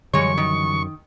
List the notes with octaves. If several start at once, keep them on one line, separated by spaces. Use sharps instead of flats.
F#2 D3 E3 G3 G#3 C#5 C#6
D#3